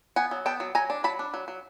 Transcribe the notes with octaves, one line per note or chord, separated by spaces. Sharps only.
B3 F#5 G#5
F#3
B3 G5 A5
F#3
F#3 G#5 A#5
D4
F#3 A5 B5
D4
F#3
F#3